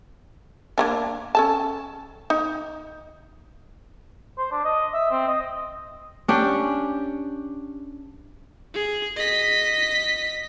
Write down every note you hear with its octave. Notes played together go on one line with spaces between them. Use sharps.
A#3 C#4 D4
C#4 A4 A5
D#4
C5
D4
D#5
E5
C4
D#5
C#4 D4 G4
G#4
D#5 B6